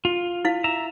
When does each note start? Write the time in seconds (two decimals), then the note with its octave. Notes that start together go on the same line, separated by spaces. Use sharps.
0.05 F4
0.45 E4 F5
0.64 E5 A#5